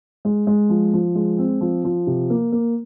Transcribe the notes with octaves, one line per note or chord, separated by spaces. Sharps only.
G#3
G#3
F3
F3
G#3
C4
F3
F3
C3
A#3
A#3